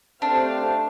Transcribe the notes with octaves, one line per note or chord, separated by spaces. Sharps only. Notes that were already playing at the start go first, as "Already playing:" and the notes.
A3 C4 D4 G4 C5 F5